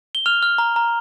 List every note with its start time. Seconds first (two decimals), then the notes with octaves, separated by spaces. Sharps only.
0.15 G7
0.26 F6 F7
0.43 F6
0.58 A#5
0.76 A#5